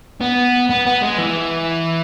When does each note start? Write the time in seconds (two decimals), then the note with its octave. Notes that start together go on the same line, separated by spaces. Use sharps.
0.21 B3
0.70 B3
0.86 B3
1.02 G#3
1.18 E3